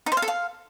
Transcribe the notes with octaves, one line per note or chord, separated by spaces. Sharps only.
D#4
C5
F5
A4
F5